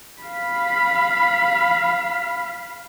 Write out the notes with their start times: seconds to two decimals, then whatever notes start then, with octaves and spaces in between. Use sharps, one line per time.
0.22 F5 B5